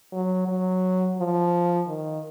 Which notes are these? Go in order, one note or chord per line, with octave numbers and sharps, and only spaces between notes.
F#3
F#3
F3
D#3